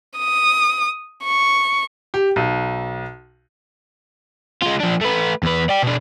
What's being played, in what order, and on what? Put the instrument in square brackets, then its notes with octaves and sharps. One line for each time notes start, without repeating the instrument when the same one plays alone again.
[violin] D#6
C#6
[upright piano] G4
B1
[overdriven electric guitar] G#3 F4
F3 D4
A3 B4
E2 B4
D5 G5
B2 D4